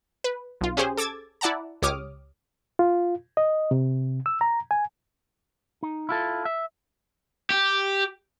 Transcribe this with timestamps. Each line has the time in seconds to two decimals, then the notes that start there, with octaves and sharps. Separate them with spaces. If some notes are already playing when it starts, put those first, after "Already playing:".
0.24 B4
0.61 B1 F4
0.77 C#4 G4 G#4 C5
0.97 A4 D6 E6 G#6 A6
1.41 E4 D5 F#5 A5 A#5
1.82 C#2 G4 C#5 D6 D#6 F6
2.79 F4
3.37 D#5
3.71 C3
4.26 E6
4.41 A#5
4.71 G#5
5.83 D#4
6.09 E4 F4 A4
6.45 E5
7.50 G4